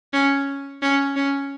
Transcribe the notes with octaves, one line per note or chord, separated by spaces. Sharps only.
C#4
C#4
C#4